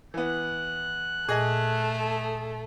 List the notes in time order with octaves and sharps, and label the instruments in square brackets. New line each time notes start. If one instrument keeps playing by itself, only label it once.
[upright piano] E3 B3 [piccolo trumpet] F#6
[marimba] A#2 [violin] A3 A4 [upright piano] G#4 D#5 G#5